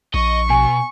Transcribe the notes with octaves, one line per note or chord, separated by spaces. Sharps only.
A#1 D#5 C#6
B2 G#5